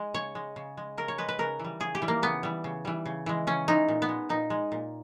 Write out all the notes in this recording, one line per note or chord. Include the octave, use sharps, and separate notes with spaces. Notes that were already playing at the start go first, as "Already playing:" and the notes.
Already playing: G#3
C#3 C#5
G#3
C#3
G#3
C#3 A#4
C#5
G#3 B4
B4
C#3 A#4
E3
G3
C#3 G#4
G4
E3 G3
A#3
C#3 B3
E3 G3
C#3
E3 G3
C#3
E3 G#3
C#3 C#4
E3 G#3 D#4
A#2
B3
G#3
A#2 D#4
G#3
A#2